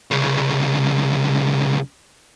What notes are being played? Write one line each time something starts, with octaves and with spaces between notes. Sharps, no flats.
C2 C#3